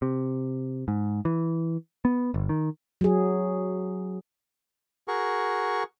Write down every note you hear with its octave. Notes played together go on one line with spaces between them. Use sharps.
C3
G#2
E3
B3
G1
D#3
F#3 G#4
F#4 G#4 A#4 C#6